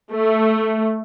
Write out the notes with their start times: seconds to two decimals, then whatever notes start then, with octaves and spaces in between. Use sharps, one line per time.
0.12 A3